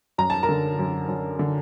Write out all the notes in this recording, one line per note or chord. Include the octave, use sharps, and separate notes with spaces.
F#2 A#5
A5
A#4 A#5
D3
F#2
F#2
D3